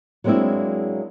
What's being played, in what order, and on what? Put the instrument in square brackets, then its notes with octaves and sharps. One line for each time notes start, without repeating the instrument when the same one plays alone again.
[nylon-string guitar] F#3 G#3 A#3 C4 D4 E4